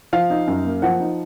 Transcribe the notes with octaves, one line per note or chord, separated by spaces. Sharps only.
F3 F5
D#4
F#2
A#3
F3 F#5
D#4